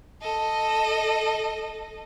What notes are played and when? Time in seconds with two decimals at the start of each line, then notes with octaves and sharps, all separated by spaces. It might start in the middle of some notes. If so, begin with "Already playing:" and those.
0.21 A4 D#5